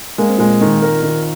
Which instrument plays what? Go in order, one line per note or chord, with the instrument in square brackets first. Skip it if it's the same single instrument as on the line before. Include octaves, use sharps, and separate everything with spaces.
[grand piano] G#3 [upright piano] A#3
[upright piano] C4
[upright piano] A#2 A#3 [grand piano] G#3
[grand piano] D#3
A#4
D#3